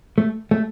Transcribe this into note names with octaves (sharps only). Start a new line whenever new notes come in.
A3
A3